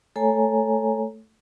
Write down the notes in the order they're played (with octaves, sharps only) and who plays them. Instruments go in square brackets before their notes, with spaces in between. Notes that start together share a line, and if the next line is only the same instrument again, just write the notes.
[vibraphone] A3 A4 C#5 G#5 A#5